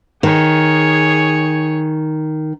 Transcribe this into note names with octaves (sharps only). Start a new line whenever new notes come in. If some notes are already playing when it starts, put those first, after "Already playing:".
D#3 G#4 C#5